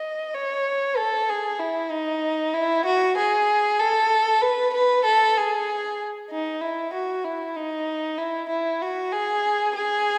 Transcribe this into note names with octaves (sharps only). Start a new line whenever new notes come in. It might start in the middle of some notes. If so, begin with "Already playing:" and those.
Already playing: D#5
C#5
A4
G#4
E4
D#4
E4
F#4
G#4
A4
B4
B4
A4
G#4
D#4
E4
F#4
E4
D#4
E4
E4
F#4
G#4
G#4